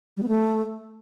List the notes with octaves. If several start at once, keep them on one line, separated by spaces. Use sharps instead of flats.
G3
B3
A3